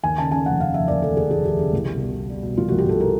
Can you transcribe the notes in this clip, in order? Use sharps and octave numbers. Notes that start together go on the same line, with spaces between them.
D#2 G#5
C#3 A5
C#3 G#5
F1 F#5
C#3 F5
F1 E5
D#2 D5
F1 A4
F1 G#4
D#2 G#4
D#2 G4
C#3 G4
C2
B2
B2
B2
G3
B2
C2 F4
F#4
C2
G4
C2 A4
A#4